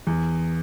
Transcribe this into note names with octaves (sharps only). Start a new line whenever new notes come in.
E2